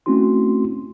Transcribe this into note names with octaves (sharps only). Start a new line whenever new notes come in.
A3 C4 C#4 E4 F#4 C6